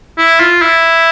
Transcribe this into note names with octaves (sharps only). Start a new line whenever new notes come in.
E4
F4
E4